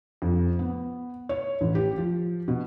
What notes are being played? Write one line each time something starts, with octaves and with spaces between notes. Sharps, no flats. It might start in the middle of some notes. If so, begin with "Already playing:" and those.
F2
B3
C#5
A1
G4
F3
B2